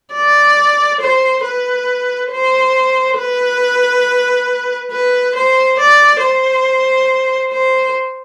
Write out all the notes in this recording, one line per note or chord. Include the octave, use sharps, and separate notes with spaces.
D5
C5
B4
C5
B4
B4
C5
D5
C5
C5